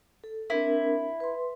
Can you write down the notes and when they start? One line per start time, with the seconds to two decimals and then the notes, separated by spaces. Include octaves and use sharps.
0.24 A4
0.50 C4 D4 E4 A#4
1.20 B4 C6